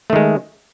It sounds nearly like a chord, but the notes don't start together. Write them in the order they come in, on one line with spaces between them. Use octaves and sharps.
A3 D#3 G#3